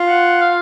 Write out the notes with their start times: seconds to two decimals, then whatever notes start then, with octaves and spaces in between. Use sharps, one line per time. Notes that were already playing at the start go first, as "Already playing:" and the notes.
Already playing: F4
0.09 F#5
0.41 F5